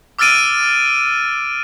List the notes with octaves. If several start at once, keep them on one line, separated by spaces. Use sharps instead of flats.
D6 E6 F6 A6 D7 D#7